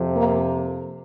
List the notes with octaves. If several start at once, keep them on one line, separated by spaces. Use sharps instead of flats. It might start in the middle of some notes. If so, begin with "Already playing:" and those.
Already playing: F2 C3 F3
A#3